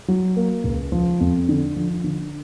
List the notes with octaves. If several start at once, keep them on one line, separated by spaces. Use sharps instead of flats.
F#3
A#3
C#2
F3
F2
D3
F3
D3